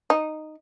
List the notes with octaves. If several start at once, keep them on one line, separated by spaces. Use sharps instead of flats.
D#4